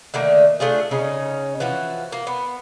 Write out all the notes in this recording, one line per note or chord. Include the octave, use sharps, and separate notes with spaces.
D3 D#3 A3 A#3
A3 D4 F4 G#4
C#3 C#4 D#4
E3 F3 F#4
A#3
B3